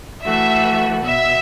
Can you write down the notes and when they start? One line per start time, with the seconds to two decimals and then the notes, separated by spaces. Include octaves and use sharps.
0.24 E3 A3 F#4 E5
1.05 B2 B3 F#4 E5